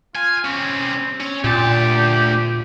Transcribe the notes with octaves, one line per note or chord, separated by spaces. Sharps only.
F4 G#5
G3 C4 C#4
C#4
D2 A#2 G4 A5